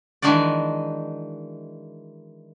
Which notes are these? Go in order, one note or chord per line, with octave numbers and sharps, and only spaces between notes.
D#3 E3 G#3 D4 F#4 D5